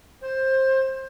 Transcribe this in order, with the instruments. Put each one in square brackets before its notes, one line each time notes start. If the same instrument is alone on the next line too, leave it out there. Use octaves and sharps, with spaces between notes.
[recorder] C5